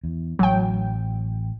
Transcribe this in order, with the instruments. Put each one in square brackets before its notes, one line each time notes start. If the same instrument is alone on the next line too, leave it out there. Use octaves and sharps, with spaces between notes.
[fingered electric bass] E2
[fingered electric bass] A1 [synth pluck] F#3 G5